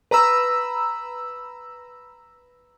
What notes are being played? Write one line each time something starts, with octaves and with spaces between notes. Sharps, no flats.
B4 A#5 B5 E6